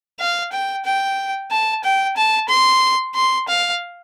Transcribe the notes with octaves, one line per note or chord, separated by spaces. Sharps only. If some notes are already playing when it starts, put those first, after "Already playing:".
F5
G5
G5
A5
G5
A5
C6
C6
F5